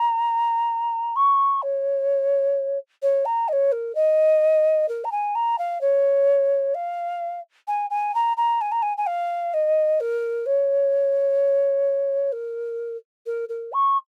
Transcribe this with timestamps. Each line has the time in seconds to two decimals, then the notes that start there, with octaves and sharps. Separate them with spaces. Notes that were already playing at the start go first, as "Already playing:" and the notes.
Already playing: A#5
1.16 C#6
1.62 C#5
3.02 C#5
3.25 A#5
3.48 D#5
3.52 C#5
3.72 A#4
3.95 D#5
4.88 A#4
5.04 A#5
5.11 G#5
5.35 A#5
5.58 F5
5.81 C#5
6.74 F5
7.67 G#5
7.90 G#5
8.14 A#5
8.37 A#5
8.61 G#5
8.71 A#5
8.82 G#5
8.97 G#5
9.06 F5
9.53 D#5
10.00 A#4
10.46 C#5
12.32 A#4
13.26 A#4
13.49 A#4
13.72 C#6